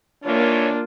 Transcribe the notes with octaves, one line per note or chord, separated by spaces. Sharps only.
D#2 E3 A#3 D4 F4 C#5